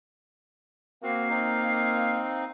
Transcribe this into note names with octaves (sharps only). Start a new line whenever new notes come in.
A#3 C4 F#4 F5
C4 D#4